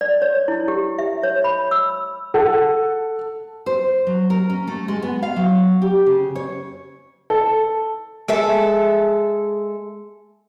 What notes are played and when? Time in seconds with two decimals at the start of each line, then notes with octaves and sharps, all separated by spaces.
0.01 D5
0.22 C#5
0.48 E4
0.68 G4
0.99 E5
1.23 C#5
1.44 B5
1.71 E6
2.34 A4 F#5
3.66 C5
4.07 F#3
4.30 A#4
4.50 C#4
4.67 A3
4.88 G#3
5.02 B3
5.23 F5
5.36 F#3
5.82 G4
6.06 C#3
6.35 C#5
7.30 A4
8.28 G#3 A4 E5